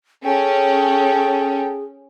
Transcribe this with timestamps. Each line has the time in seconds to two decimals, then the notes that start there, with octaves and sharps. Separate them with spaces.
0.24 C#4 G#4 A4 G5